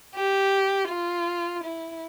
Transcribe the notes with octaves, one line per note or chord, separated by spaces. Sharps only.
G4
F4
E4